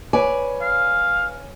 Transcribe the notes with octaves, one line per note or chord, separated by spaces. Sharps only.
B4 C#5 D5 G#5
F5